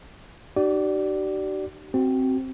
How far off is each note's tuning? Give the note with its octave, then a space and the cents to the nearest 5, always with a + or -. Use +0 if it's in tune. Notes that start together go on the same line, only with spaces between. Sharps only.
D#4 -45 G4 -45 D5 +0
C4 +0 F#4 +25